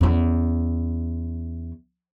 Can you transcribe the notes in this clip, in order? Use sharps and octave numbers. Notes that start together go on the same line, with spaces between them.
E2 C#4